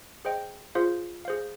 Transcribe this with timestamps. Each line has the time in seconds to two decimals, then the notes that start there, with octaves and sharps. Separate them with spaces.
0.25 G#4 C5 D#5 G5
0.75 F4 G#4 C5 F5
1.25 G#4 C5 F5